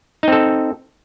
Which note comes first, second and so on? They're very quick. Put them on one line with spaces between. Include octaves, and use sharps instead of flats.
D#4 C4 A4